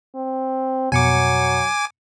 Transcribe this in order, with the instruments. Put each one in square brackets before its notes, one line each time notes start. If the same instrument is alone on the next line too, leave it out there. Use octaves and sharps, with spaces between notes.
[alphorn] C4
[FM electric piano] F2 B2 C#7 [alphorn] F#3 [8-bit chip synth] G#5 D6